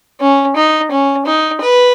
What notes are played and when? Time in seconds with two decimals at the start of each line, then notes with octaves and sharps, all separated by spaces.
0.21 C#4
0.56 D#4
0.91 C#4
1.26 D#4
1.61 B4